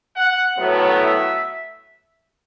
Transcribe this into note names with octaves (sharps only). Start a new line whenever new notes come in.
F#5
A2 F#3 B3
E5